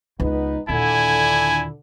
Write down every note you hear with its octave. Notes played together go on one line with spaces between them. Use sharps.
C#2 B3 D#4 B4
D#2 A#2 D3 E4 G#5